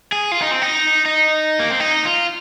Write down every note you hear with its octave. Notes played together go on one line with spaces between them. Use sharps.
G#4
F4
D#4
C4
D#4
D#4
A#3
C4
D#4
F4